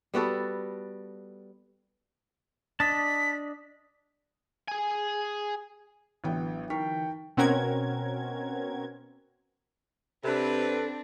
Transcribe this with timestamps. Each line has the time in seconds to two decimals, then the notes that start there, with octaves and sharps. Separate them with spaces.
0.14 G3 B3 F#4 A4
2.80 D4 D#5 A5 B6
4.68 G#4 G#5
6.24 A1 D3 E3 F#3 B3 G5
6.70 D#4 A#4 G5 C#6 B6
7.37 B2 C4 C#4 F#4 A#4 G#6
10.24 C3 C4 D4 A4 B4